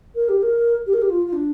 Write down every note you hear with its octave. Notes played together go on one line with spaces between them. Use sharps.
A#4
G4
A#4
G4
A#4
G4
F4
F4
D4